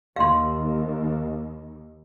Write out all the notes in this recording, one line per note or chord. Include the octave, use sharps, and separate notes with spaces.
D#2 F5 C6